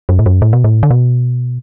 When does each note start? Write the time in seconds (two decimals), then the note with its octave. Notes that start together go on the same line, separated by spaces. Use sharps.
0.09 F#2
0.19 A2
0.26 F#2
0.42 A2
0.53 B2
0.64 A2
0.83 D3
0.90 B2